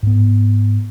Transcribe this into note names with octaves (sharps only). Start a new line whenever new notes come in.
G#2 B3